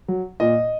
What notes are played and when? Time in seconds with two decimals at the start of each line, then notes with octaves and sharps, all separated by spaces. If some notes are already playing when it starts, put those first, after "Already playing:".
0.08 F#3
0.40 A#2 D#5